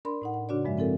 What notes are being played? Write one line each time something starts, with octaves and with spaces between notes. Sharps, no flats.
D4 A#4 D5 B5 C6
A2 D#4 F#5
F#5
C#3 D4 F#4 D5
G2 F3 G#3 E5
C4 E4 A4 A#4